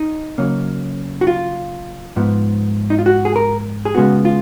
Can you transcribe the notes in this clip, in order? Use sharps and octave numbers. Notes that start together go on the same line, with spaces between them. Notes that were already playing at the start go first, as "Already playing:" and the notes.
Already playing: D#4
C#3 F#3 A#3 C#4
F#4
F4
G#2 F3 B3
D#4
F4
F#4
G#4
A#4
G#4
C#3 G#3 B3 F#4
F4